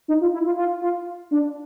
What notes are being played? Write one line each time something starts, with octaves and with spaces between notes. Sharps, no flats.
D#4
F4
E4
F4
F4
F4
D4